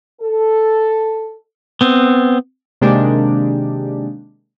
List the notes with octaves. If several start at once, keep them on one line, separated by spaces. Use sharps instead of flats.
A4
B3 C4
C3 D#3 G#3 A#3 D4 G4